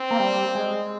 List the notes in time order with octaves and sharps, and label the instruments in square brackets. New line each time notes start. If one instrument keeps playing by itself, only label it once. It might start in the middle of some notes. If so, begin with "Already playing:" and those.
Already playing: [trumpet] C4
[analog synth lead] A#3
G3
G#3